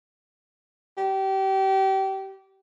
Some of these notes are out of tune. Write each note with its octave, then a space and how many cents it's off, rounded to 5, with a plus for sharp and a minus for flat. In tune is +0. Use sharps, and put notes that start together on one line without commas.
G4 -30